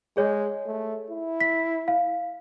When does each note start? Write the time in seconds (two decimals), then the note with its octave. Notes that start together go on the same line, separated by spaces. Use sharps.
0.17 G#3 G#4 C#5
0.66 A3
1.10 E4
1.41 B6
1.88 F5